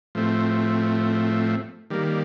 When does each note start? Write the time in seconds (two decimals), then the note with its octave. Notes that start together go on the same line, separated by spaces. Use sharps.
0.15 A2 F3 A3 C4
1.90 D#3 G3 A#3